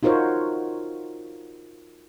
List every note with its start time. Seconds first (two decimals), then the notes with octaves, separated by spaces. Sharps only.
0.03 D#4 F4 F#4 A#4 C5 C#5